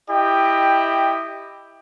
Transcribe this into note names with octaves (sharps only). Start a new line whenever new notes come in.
E4 G4 D#5 G5